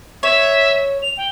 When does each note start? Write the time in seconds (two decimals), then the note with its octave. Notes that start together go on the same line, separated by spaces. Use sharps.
0.23 C#5 E5
1.02 F7
1.17 G5